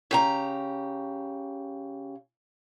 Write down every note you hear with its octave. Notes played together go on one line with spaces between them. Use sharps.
C#3 G4 A#5